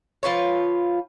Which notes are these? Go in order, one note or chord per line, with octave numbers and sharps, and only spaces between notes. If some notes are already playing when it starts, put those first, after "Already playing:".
F3 F4 B4 C#5